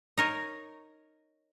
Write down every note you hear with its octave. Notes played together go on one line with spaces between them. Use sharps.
D#4 A#4 C#5